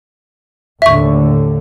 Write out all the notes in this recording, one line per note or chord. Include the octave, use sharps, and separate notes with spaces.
D#2 A2 D3 E5 C#6